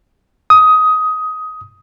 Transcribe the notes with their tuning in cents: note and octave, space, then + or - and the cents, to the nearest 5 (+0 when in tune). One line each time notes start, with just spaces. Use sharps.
D#6 +15